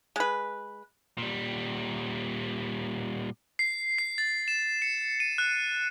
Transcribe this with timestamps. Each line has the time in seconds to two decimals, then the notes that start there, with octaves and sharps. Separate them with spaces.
0.16 G#3 B4
1.18 A#2 G3
3.59 C7
3.98 C7
4.18 A6
4.48 E7
4.82 C#7
5.20 D#7
5.38 F#6